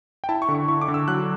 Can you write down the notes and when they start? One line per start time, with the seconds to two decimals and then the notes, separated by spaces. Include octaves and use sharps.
0.24 G5
0.29 E4 A5
0.42 C#6
0.48 D3
0.55 C#6
0.68 E4 C#6
0.81 D6
0.88 D3
0.94 E6
1.08 F#3 F#6